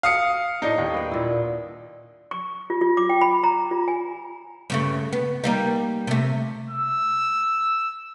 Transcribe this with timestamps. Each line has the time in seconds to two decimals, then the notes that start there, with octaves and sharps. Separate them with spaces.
0.03 F5 D#6 C#7
0.62 A2 D4 D#4 D#5 G5
0.78 D#2
0.94 B3 G5
1.12 A#2 E4
2.31 C#6
2.70 F4
2.81 F4
2.97 D6
3.09 G5
3.21 B5
3.43 A#5
3.71 F4
3.88 G#5
4.70 G2 C#3 A3
5.13 B3
5.44 G3 A#3 D#4
6.07 C3 A3
6.70 E6